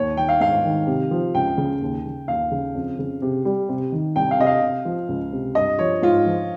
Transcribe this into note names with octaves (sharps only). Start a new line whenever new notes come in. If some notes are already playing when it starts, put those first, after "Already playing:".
Already playing: D#2 C#5
D#3 G5
F5
G#2 F5
D#3
C3
F3
C#2 G5
C#3
D#2
C#3
D#2 F5
C#3
F2
C#3
C3
G3
C3
D#3
C2 G5
F5
C3 D#5
F5
C3
F3
C#2
C3
G2 D#5
F3 C#5
G#2 F4
F3